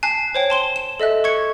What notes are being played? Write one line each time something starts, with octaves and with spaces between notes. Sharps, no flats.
G#5 A5 F#6 C7
C5 C#5 G5
A5 C6 G7
E7
A4 D#5 E5 F#6
C#6 G#6 C#7